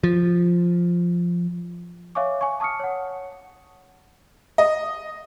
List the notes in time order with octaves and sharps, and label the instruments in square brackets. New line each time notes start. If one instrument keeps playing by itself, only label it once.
[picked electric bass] F3
[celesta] C#5 E5 F5 G#5 C#6 D6
G#5 C#6
A5 C#6 D#6 F6 C#7
C#5 F#5
[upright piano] D#5